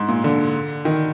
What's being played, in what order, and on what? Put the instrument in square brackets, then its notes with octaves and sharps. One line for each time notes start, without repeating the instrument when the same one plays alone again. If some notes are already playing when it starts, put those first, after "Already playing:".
Already playing: [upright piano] G#2
A#2
D3
D#3